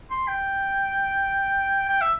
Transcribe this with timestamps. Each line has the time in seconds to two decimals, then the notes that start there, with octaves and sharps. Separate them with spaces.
0.10 C6
0.28 G5
1.89 G5
2.01 E5